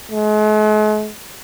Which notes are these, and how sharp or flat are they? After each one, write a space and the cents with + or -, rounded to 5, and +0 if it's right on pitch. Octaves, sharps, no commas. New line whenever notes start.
G#3 +45